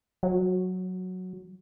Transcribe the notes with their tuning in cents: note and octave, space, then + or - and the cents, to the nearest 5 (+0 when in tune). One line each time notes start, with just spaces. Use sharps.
F#3 -5